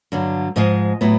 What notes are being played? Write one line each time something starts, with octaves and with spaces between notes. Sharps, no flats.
G2 D3 F#3
G#2 F3 G#3 D#5
A2 F#3 B3